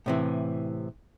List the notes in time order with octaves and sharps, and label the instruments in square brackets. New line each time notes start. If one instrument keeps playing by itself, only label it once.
[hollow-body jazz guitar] A2 C3 E3